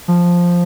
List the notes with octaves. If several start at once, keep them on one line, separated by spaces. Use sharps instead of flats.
F3